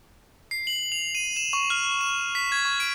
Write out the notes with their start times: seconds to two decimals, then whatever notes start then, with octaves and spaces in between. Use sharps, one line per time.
0.51 C7
0.67 F#7
0.92 F7
1.15 D#7
1.36 E7
1.53 C#6
1.70 F6
2.01 E7
2.35 B6
2.52 G#6
2.65 C#6
2.80 D7